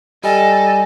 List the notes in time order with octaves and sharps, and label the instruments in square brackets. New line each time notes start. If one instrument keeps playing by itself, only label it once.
[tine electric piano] G3 [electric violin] A4 [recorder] D#5 [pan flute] G#5